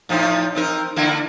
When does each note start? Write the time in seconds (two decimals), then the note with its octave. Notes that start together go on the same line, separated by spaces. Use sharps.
0.09 A2 F3 D#4
0.55 C4 D#4 A#4
0.96 D3 A#3 E4